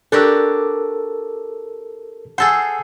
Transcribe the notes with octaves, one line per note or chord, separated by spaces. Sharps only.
D4 F#4 G4 A4 A#4 E6
G#4 A4 C5 F#5 E6